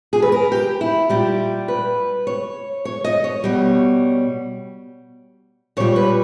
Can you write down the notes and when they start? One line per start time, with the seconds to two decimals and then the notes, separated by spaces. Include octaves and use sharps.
0.13 G#4
0.22 B4
0.32 A#4
0.52 G4
0.81 E4
1.09 A#2 G3 G4
1.68 B4
2.27 C#5
2.85 C#5
3.04 D#5
3.24 C#5
3.44 B2 G3
5.77 A#2 G3 C#5
5.96 B4